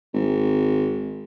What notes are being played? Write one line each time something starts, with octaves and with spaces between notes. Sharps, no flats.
G#1